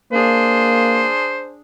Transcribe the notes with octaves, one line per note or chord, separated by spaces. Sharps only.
A#3 D4 G#4 C5